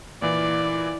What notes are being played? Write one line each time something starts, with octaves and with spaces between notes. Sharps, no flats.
A#2 E3 E4 D5